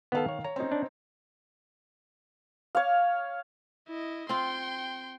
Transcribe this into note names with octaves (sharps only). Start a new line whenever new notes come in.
D#3 B3 A4 F5
C#5
C#5 A#5
C4 C#4 D#4
D4
C#5 F5
E4 D#5
C4 F4 G5 C6